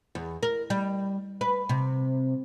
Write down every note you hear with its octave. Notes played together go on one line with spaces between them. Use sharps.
E2
A#4
G3
B4
C3